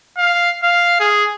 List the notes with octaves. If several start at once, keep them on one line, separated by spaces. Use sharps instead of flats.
F5
F5
G#4